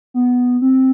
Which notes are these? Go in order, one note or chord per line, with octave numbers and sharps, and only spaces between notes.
B3
C4